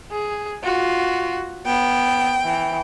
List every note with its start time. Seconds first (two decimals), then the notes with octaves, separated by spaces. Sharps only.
0.11 G#4
0.64 F4 F#4
1.66 B3 G5
2.44 E3